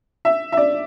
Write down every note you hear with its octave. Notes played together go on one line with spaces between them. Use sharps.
E5
E5
D5